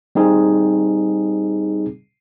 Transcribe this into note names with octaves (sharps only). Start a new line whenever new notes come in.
G3 C4 D#4 G#4